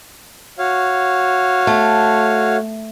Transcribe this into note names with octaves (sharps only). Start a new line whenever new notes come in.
F#4 C#5 F5
A3